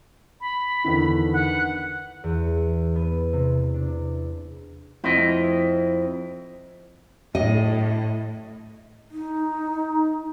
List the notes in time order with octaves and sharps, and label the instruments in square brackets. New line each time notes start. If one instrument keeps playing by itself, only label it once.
[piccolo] B5
[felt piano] E2 D3 D#3
[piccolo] F#5
[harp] E2
B3
C3
D4
[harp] F2 C4 [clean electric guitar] E4 D#5
[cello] A2 [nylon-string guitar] D#5
[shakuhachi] D#4